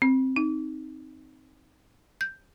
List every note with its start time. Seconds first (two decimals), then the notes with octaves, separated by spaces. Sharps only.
0.02 C4
0.36 D#4
2.21 G6